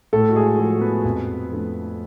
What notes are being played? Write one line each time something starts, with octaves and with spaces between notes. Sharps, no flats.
A2 A3 A4
F#4
G#3 G#4
F3 A3 F#4
B3 B4
F2
F3 A3 D4